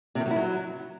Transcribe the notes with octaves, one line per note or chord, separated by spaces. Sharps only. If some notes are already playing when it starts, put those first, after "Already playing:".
C3
D#3
F#3
E4
F#3